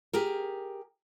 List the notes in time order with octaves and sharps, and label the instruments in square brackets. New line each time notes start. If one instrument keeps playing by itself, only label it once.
[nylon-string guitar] G4 G#4 A#4